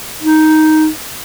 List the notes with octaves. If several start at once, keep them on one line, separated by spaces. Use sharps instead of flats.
D#4